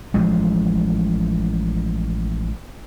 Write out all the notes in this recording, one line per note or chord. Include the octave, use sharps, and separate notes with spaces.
A1 F3 G#3